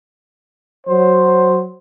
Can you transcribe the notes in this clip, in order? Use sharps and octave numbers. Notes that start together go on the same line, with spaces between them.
F#3 C5